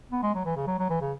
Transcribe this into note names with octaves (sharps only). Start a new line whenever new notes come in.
B3
G#3
F#3
E3
C#3
F#3
F#3
E3
C#3